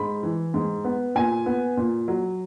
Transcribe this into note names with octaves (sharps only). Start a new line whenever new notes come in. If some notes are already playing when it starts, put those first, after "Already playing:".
Already playing: G#2 B5
E3
G#2
B3
A#2 G#5
B3
A#2
F#3